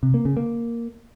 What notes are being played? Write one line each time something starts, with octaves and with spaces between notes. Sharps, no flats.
C3
A#3
C#3
A#3